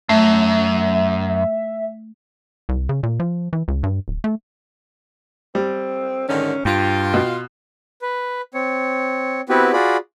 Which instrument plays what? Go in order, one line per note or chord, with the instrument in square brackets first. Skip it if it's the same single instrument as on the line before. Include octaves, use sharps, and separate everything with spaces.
[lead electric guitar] F#2 [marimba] A3 [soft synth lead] E5
[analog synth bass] C2
C#3
A#2
F3
E3
C#2
G2
D1
A3
[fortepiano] G3 [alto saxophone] C4
[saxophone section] G#2 D3 D#3 [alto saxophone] C#4
[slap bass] G2 [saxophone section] F4 [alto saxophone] G5
[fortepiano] B2
[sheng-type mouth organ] B4
C4 C#5
B3 C4 E4 F#4 G4 B4
F4 F#4 G#4 D5 B5